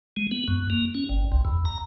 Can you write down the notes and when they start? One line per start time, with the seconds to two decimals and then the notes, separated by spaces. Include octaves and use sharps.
0.17 G#3
0.31 B3
0.48 F#2
0.70 A#3
0.95 C#4
1.09 G1
1.32 C2
1.45 E2
1.65 A#5